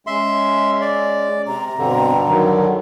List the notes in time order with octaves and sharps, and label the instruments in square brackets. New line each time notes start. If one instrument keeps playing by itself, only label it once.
[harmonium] G#3 C#4 [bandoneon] E5 C6
[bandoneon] D5
[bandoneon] C3 [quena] A#5
[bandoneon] G2 D3 [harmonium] B2 C4
[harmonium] D#3 F#3